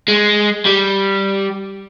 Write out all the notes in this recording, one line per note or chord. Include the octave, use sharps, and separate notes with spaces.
G#3
G3